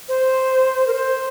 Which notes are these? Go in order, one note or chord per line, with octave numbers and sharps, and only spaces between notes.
C5
A#4
C5